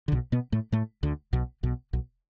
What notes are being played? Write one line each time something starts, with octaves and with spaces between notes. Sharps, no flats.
D3
B1 B2
B2 B3
A2 A3
A2 A3
D2 D3
B1 B2
B1 B2
B1 B2